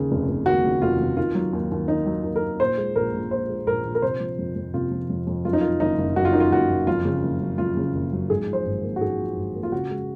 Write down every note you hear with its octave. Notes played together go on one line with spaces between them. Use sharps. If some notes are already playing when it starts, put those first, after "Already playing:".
Already playing: D#2 C#3 G#4
F1
F1
D#2 F#4
C#3
F1 F4
F1
D#3 F4
F#3
D#2
D#2
D#3 D#4
F#3
D#2
A#4
D#2
A#2 C5
G#3
A#1 A#4
A#1
A#2 C5
G#3
A#1 A#4
A#1
A#4
C3 C5
F3
F2
F2
C3 F4
F3
F2
F2
F#2 F4
D#4
D#3 F4
F#1 D#4
F#1
F#2 F#4
F4
D#3 D#4
F4
F#1 F#4
F#1
F2 F4
C#3
F#1
F#3
F2 F4
C#3
F#1
F#3
G#2 G#4
F3
C5
G#1
A#3
F#4
G#2 G#4
F3
G#1
A#3
F4
C#3 F#4
G#3